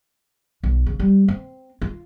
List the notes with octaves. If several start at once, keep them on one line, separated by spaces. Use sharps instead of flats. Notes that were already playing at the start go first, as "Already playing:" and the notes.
B1
C#3
G3
C4
F4